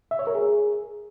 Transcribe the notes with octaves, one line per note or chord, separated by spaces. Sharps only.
E5
C#5
A#4
G#4